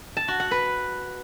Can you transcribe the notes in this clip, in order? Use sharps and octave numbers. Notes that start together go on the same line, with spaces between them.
A5
F#4
F#5
B4